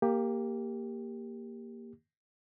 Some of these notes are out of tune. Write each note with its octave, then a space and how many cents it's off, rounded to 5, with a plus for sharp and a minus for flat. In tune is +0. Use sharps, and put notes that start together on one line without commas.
A#3 +0 G4 +10